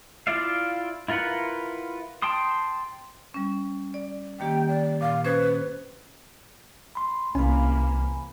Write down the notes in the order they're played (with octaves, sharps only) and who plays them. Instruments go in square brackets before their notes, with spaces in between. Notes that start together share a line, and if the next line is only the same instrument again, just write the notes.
[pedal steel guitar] E4 F4 D5 E5 F5
E4 F4 A#4 B4 F#5
G5 A5 C6 D#6
[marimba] G3 C#4
D5
[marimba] D#3 A#3 G4 [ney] G5
[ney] D5
[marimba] A#2 [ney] F5
[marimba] C#4 C5 G#6 [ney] B4
[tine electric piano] B5 C6
[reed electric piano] C2 [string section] C3 E3 A#3 [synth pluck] C#4 [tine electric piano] G#5 B5